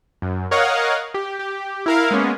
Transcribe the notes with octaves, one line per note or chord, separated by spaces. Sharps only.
F#2
A#4 C#5 D#5 F5 F#5
G4
G4
E4 A#4 F5
G#3 A#3 B3 C#4